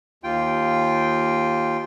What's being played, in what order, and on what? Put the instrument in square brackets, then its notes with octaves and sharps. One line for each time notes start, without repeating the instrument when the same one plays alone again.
[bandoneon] D#2 F4 G5